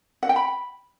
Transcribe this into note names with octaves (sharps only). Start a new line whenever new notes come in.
F#5
G5
B5